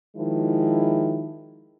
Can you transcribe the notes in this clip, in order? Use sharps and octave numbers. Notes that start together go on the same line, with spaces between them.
D#3 F3 G#3 E4